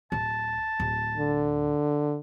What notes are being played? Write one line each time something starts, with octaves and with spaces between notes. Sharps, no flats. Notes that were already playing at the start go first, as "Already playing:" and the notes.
D1 A5
D1
D3